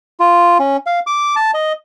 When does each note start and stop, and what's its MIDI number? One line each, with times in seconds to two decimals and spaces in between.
0.20 0.58 65
0.60 0.77 61
0.86 1.00 77
1.07 1.35 86
1.36 1.51 81
1.54 1.73 75